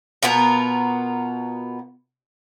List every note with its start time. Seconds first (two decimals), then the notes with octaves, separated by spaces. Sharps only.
0.23 B2 B3 F4 A#4